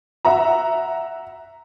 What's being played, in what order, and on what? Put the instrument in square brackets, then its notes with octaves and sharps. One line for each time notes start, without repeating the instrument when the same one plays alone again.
[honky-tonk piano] E5 F#5 A#5